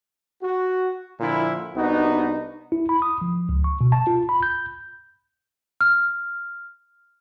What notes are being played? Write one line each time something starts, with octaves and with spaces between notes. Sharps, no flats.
F#4
A#2 D3 F3 E4
C2 B3 D4 D#4 F#4
E4
B5
D#6
F3
C#2
C#6
B2
A5
F4
B5
G6
F6